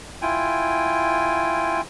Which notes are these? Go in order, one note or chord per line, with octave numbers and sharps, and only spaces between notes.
E4 F4 G5 G#5